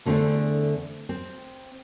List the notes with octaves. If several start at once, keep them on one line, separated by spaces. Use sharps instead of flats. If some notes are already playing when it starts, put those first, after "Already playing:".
E2 D3 A3 C4 D4 G#4
C4